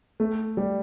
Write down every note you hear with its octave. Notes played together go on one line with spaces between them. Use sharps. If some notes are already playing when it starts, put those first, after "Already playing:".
A3
G3